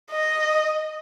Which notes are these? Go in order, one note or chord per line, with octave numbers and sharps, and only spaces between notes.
D#5